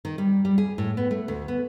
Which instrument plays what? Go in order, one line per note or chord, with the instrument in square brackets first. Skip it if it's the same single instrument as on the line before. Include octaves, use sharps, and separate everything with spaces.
[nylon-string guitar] D#3
G3
G3
G#4
A2
B3
A3
D2
B3